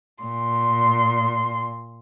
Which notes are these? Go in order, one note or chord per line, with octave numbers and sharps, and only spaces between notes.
A#2 C6